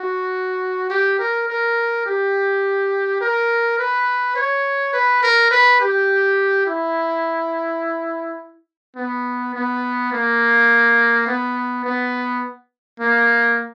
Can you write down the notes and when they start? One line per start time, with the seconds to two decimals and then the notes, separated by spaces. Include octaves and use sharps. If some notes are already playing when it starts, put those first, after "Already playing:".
Already playing: F#4
0.90 G4
1.19 A#4
1.48 A#4
2.06 G4
3.21 A#4
3.79 B4
4.36 C#5
4.93 B4
5.23 A#4
5.51 B4
5.80 G4
6.66 E4
8.96 B3
9.54 B3
10.12 A#3
11.27 B3
11.85 B3
13.00 A#3